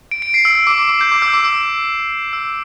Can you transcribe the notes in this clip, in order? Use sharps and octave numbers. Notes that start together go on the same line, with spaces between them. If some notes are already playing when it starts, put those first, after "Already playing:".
D7
D7
C7
E6
E6
D6
D6
D6
G6
D6
E6
D6
E6
E6